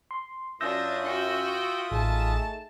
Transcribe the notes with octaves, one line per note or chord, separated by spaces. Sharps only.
C6
F#2 D4 F4 E5 D#6 E6 G6 A#6
F#4 G5
A1 A3 D#4 G#4 A5